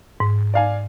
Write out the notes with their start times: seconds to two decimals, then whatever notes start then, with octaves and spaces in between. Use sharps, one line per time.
0.20 G#2
0.54 D5 F5 G#5